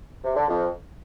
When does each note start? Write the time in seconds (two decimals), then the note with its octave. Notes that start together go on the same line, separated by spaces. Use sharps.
0.24 C3
0.36 D3
0.47 F2